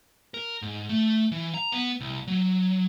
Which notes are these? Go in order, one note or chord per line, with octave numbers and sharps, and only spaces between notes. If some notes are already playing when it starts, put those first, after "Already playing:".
A#4
G#2
A3
E3
A#5
B3
C2
F#3